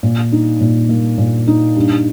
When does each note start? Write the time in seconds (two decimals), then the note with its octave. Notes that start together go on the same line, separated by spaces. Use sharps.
0.03 A#2
0.32 D#4
0.60 A#2
0.89 A#3
1.18 A#2
1.47 D#4
1.76 G2